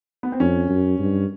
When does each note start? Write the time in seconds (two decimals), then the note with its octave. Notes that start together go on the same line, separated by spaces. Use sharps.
0.23 B3
0.32 C4
0.40 F2 C#4
0.69 F#2
0.99 G2